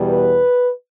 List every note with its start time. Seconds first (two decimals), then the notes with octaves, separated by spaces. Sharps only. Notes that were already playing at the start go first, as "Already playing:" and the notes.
Already playing: E2 B2 G3
0.08 B4